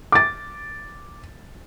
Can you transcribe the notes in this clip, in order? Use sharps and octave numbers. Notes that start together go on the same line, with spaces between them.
D6 A6